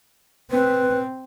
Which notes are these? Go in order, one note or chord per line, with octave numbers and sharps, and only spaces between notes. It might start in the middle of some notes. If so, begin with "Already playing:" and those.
C4 B4